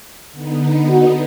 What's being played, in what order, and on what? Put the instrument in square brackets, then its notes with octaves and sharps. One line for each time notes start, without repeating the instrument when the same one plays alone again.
[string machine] D3 B3 D#4
[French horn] F#4